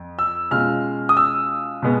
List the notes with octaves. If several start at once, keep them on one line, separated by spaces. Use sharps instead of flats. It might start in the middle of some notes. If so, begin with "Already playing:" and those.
Already playing: F2
E6
B2 G#3 C#4 F4 F6
D#6
E6
B2 G#3 B3